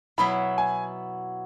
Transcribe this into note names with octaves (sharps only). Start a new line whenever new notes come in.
B2 F#3 B3 E4 B5
G#5